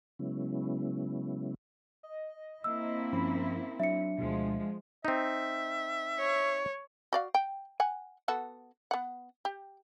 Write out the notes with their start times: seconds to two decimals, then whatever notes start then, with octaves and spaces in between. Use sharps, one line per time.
0.19 C#3 F#3 G#3 B3 C#4 E4
2.03 D#5
2.64 A#3 C4 E4 E6
3.12 G2 F3 C#4 B5
3.80 F#3 D4 E5 C#7
4.18 D2 B2 F3 G#3
5.05 C4 D#4 E5
6.19 C#5
7.13 F#4 D5 F5
7.35 G5
7.80 F#5 G#5
8.28 B3 F#4 A4
8.91 B3 F#5
9.45 G4